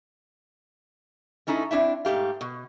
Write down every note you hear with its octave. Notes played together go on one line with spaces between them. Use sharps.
A3 C#4 D#4 E4 A4
C4 D4 E4 E5
G#2 A3 G4 F5
B2